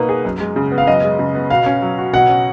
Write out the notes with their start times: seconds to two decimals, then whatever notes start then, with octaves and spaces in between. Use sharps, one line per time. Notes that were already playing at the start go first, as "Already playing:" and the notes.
Already playing: B2 A#3 D#4 B4
0.09 G#4
0.25 F#2
0.40 G#3
0.56 C#3
0.72 B3
0.78 F5
0.87 F#2 D#5
1.04 G#3
1.19 C#3
1.35 B3
1.50 B2 F5
1.66 C#4
1.82 F#3
1.98 F#4
2.13 B2 F#5
2.29 C#4